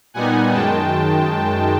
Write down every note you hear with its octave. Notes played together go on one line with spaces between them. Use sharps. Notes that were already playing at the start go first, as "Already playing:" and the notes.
A#2 G3 B3 D#4 F#5 G#5
F#2 D#3 G#3 G5 A5